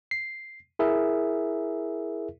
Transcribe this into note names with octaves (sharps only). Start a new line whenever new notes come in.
C7
E4 G#4 A#4 E5